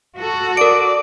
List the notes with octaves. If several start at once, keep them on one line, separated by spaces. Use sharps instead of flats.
F#4 A4
A#4 D5 D7